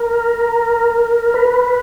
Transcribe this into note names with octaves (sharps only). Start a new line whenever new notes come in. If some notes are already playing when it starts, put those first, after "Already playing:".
Already playing: A#4
B4